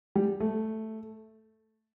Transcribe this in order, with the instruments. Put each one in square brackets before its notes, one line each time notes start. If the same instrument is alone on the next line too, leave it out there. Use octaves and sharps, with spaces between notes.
[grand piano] G3
A3